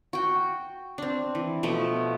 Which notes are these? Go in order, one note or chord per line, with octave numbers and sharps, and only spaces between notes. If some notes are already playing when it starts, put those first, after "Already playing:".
F#4 G5
C4 D4
E3
B2 F3 A3